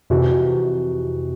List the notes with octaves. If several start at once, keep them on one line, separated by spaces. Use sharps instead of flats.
F2 C3 E3 F#4